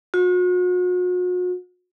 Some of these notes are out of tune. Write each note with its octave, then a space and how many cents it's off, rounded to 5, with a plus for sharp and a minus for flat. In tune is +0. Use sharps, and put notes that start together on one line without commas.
F#4 -40